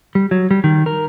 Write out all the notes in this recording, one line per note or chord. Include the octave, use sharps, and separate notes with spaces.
G3
F#3
G3
D#3
A#4